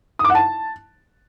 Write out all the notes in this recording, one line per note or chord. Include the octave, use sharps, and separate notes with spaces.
D#6
D6
F#5
A5